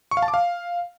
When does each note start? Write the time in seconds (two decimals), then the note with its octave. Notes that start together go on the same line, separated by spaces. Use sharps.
0.11 C#6
0.17 F5
0.23 A5
0.28 D6
0.34 F5